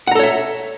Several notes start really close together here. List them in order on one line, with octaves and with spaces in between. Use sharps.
F#5 A#5 A4 C#5 E5